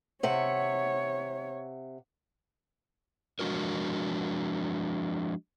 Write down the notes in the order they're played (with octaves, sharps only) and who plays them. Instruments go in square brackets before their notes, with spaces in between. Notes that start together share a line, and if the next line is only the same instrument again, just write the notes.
[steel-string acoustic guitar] C3 E5 F#5 [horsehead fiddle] C#5
[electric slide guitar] F3 G#3 D4 F#4 A#4